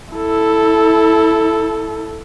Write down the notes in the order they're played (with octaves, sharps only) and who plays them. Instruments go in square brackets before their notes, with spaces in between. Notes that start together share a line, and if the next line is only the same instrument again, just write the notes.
[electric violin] E4 A4